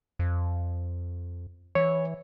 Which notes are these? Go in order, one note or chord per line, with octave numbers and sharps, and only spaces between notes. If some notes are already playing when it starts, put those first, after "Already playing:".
F2
E3 C#5